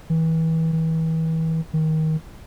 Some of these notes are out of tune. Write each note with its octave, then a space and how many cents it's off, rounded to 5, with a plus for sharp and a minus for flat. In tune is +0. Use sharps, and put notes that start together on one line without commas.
E3 -30
E3 -35
D#3 +20